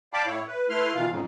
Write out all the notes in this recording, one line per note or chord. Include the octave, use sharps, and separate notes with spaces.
D5 F5 G5 A5 B5 D6
A2 E4 C#5
B4
A3 E4 B4 C6 F6
B2 D#3 E3 F4 F5
F2 G#2 C#3